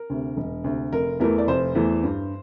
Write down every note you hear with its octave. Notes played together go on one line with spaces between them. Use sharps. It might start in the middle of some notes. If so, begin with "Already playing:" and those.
Already playing: A#4
D2 C3
E1
D2 C3
F1 A#4
E2 E3 A3 A#4
D5
F1 C5
E2 E3 A3
G2